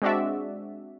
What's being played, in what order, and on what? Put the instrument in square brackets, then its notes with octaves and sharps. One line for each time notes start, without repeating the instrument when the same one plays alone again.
[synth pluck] G#3 C4 D4 F#4 D5 E5